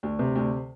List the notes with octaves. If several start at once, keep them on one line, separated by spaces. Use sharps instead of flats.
D2
C3
D2